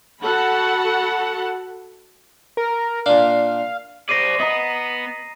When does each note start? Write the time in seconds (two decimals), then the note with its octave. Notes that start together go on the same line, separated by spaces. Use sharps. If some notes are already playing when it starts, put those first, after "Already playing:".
0.22 F#4 A4 F#5 A5 B5
2.57 A#4
3.06 A#2 D4 F5
4.09 C5 D5 A#6 C7 D#7
4.39 B3 D#5 A#5